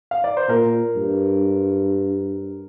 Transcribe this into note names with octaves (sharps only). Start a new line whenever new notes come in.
F5
D5
C5
A#2 A#4
G2